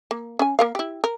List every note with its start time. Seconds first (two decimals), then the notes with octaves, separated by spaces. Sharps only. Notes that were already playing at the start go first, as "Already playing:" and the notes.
0.11 A#3
0.39 C#4 G#5
0.59 A#3 A#4 F5
0.75 E4 G4
1.04 A#4